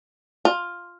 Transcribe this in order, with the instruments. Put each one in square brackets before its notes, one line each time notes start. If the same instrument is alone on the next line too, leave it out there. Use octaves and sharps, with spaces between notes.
[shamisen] F4